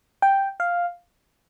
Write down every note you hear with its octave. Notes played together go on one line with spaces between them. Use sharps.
G5
F5